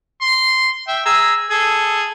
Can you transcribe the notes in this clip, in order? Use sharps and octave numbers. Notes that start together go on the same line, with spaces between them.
C6
E5 G5
G#4 A#5 E6
G#4 A4